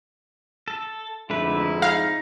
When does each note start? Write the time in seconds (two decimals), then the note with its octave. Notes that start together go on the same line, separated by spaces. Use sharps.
0.68 A4
1.30 F2 G#2 D3 A3 E4 B4
1.82 D#4 F5